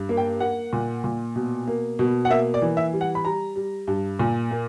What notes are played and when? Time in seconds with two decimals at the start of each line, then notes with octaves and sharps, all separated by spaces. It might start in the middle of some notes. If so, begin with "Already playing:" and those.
Already playing: G2
0.09 A#3
0.17 G5
0.40 A#3 F#5
0.73 A#2
1.04 A#2
1.36 B2
1.68 A#3
1.99 B2
2.25 F#5
2.30 A#3 E5
2.54 D5
2.62 E3
2.77 E5
2.93 G3
3.01 F#5
3.15 B5
3.25 G3 A#5
3.56 G3
3.88 G2
4.19 A#2
4.51 A#3